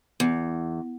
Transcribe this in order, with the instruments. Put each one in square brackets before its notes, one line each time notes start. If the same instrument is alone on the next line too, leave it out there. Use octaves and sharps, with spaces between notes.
[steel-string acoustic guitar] E2